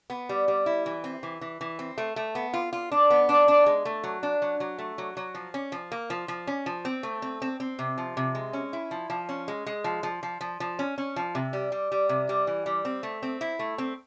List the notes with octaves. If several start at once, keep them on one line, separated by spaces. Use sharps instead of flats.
B3
G3
G3
E4
E3
C4
E3
E3
E3
C4
A3
A3
B3
F4
F4
D4
B3
D4
D4
G#3
A3
F#3
D4
F#3
F#3
A3
F#3
F#3
F3
C#4
F3
A#3
F3
F3
C#4
F3
C4
A3
C4
C4
C4
C3
F3
C3
G#3
C#4
E4
F3
F3
C#4
G#3
G#3
F3
F3
F3
F3
F3
C#4
C#4
F3
C3
G3
G3
G3
C3
G3
E3
G3
C4
A3
C4
E4
A3
C4